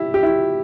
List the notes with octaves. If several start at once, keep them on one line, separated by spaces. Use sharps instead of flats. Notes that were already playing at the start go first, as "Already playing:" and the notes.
Already playing: E4 G4
G4
E4